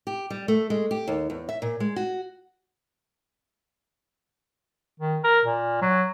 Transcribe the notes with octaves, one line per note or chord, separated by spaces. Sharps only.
G4
G3
A3
G#3
G4
D#2
E2
E5
A#2
G#3
F#4
D#3
A#4
A#2
F#3